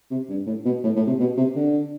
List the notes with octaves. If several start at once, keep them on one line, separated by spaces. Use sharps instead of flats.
C3
G2
A2
B2
A2
A2
C3
B2
C3
D3